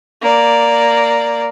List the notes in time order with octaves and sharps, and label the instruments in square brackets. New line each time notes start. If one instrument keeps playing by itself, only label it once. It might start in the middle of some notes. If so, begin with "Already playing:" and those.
[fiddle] A#3 D5